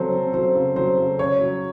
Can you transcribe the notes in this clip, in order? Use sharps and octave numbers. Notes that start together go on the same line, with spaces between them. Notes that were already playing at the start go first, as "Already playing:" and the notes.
Already playing: C#3 F#3 C4 A4 C5
C4
F#3 C5
C#3
F#3 C5
C#3
C#3 C#5
F#3